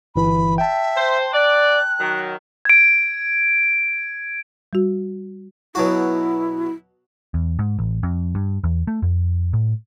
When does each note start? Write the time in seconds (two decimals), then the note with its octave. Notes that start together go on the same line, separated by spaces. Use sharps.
0.16 G1 E3 B5
0.58 E5 G5 A5
0.96 C5
1.33 D5 F#6
2.00 D#3 F#3
2.65 G#6 D7
4.73 G3 F#4
5.75 B2 F#3 E4 F#4
7.34 E2
7.59 G#2
7.79 A1
8.03 F2
8.35 G2
8.64 E2
8.87 A3
9.02 F2
9.53 A2